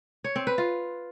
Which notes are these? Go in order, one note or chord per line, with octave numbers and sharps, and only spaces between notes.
C#5
C4
B4
F4